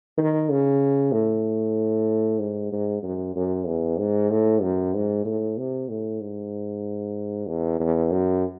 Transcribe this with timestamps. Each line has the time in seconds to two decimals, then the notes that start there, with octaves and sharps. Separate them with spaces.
0.18 D#3
0.50 C#3
1.12 A2
2.39 G#2
2.72 G#2
3.03 F#2
3.35 F#2
3.66 E2
3.99 G#2
4.30 A2
4.62 F#2
4.94 G#2
5.25 A2
5.57 C3
5.89 A2
6.21 G#2
7.47 E2
7.80 E2
8.11 F#2